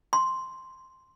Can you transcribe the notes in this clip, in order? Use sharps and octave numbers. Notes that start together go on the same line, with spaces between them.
C6